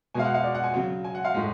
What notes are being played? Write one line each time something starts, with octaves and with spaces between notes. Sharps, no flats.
B2 G#3 F5 G#5
F#5
F5
D5
F#5
G#5
C#3 F#3
G#5
F#5
F5
A2 G#3